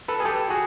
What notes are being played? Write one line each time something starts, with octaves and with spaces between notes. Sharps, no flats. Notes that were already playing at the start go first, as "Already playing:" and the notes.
A4 B4
G#4
G4 A4
F#4 G#4